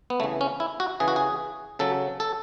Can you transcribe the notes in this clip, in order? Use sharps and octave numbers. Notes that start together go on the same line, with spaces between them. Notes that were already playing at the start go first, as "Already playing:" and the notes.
B3
C#3 E3 A3
C#4
E4
F#4
C#3 E3 G#4
F#4
G#4
C#3 F#3 A4
A4